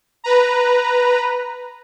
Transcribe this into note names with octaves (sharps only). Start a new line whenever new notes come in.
B4 A#5